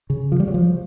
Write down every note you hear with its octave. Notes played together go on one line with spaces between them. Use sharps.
C#3
F3
G3
F#3
F3